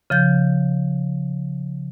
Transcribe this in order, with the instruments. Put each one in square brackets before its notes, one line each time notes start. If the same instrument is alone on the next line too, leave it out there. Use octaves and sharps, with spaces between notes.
[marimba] C#3 F3 G6